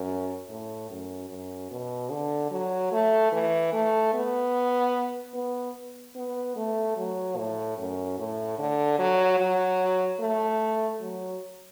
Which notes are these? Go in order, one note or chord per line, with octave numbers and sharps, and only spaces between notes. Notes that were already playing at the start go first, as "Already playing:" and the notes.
Already playing: F#2
A2
F#2
F#2
B2
D3
F#3
A3
E3
A3
B3
B3
B3
A3
F#3
A2
F#2
A2
D3
F#3
F#3
A3
F#3